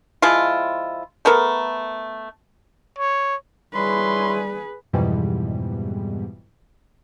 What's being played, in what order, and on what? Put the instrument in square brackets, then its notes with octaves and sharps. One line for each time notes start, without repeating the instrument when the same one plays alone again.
[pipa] F3 G#3 E4 F4
A3 B3 A4 A#4
[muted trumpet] C#5
[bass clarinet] G3 [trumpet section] E4 C#5 C6 [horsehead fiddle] G#4 B4
[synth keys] F2 G#2 B2 E3 G3